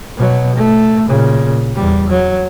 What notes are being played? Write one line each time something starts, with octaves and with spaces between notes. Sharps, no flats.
B2 F#3
A3
A#2 C#3
E2 G3
F#3